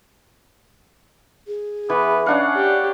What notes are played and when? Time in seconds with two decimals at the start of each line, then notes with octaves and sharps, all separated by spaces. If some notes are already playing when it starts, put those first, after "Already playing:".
1.47 G#4
1.90 E3 B3
2.26 C#4 D4 F5 F#5
2.55 G4 D5